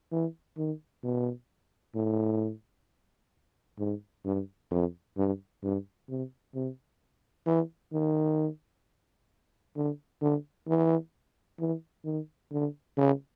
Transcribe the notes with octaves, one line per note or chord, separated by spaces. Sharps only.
E3
D#3
B2
A2
G#2
G2
F2
G2
G2
C3
C3
E3
D#3
D3
D3
E3
E3
D#3
D3
C#3